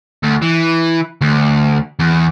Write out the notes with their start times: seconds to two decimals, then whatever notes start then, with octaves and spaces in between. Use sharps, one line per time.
0.23 D2
0.42 E3
1.21 D2
1.99 E2